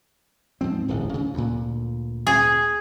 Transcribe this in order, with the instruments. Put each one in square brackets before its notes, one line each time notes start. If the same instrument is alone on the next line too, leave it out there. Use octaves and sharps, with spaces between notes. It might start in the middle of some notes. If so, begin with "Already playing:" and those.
[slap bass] G#2 F3 C4
D1 A1
C#3
D2 A#2
[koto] G#4